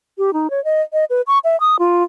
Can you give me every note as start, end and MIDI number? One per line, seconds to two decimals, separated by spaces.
0.18 0.33 67
0.33 0.50 63
0.50 0.63 73
0.64 0.82 75
0.93 1.05 75
1.10 1.22 71
1.27 1.39 85
1.44 1.59 76
1.60 1.76 87
1.79 2.03 65